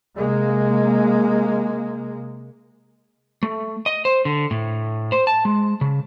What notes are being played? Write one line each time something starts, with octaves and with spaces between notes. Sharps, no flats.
C3 G#3 A#3
A3
D#5
C5
D3
A2
C5
A5
G#3
C#3